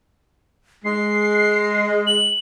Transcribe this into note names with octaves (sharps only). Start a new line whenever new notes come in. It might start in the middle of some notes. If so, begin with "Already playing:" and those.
G#3 C7
F#7